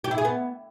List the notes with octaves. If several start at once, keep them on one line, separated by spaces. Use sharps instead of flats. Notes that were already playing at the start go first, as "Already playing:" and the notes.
G4
E4
G#4
B3